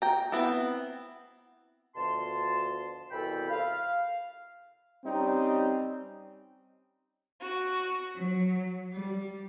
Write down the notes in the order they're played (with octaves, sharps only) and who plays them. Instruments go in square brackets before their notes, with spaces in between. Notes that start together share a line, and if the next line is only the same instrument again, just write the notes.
[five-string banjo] G5 A#5
B3 C4 E4
[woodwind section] D2 B2 F3 A5 C6
C2 B2 E3 A4 G5 B5
F5
[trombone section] G3 C4 C#4 D#4
[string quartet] F#4
F#3
G3